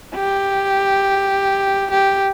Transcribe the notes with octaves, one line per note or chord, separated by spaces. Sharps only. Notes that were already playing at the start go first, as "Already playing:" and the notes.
G4
G4